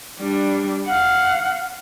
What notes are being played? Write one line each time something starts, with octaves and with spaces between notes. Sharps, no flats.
G3 D4
F5 F#5